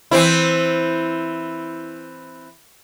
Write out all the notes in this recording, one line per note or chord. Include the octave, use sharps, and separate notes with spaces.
E3 C4 E4